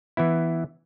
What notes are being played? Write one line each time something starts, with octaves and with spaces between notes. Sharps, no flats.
E3 B3 E4